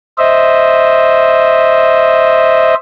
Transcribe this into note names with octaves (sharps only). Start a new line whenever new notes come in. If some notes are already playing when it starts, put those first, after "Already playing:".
C5 D#5 E5